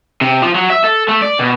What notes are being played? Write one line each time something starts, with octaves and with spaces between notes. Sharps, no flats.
C3
F3
F#3
E5
A4
A3
D5
B2